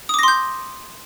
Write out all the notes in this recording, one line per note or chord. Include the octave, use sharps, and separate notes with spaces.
C6 D6 D#6 G6 A#6